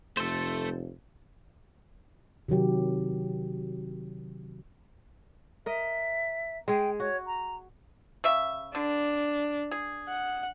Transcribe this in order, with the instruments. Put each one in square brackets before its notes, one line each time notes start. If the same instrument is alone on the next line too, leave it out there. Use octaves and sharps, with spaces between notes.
[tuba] F1 [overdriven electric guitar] A3 [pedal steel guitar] A4 C5
[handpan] C3 D#3 F#3 G4
[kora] A#4 D#5 [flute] E5
[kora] G#3 G#4 [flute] G5
[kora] F#4 [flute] C#5
[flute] A#5
[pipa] C#3 E5
[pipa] D3 [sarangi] D4
[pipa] G#4
[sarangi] F#5